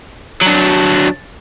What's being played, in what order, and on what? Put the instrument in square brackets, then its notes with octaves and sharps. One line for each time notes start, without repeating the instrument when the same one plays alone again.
[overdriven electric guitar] F#3 D4